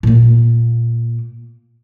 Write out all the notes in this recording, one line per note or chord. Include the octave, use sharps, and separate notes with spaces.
A#2 A#3